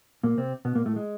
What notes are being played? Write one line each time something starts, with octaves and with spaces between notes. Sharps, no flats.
A#2 A#3
C3 C4
B2 B3
A#2 A#3
A2 A3
G#3